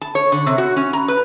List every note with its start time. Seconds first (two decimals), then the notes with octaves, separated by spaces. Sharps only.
0.02 A5
0.15 C#5
0.32 D3
0.46 C3
0.58 F#4
0.76 C#4
0.93 A#5
1.08 B4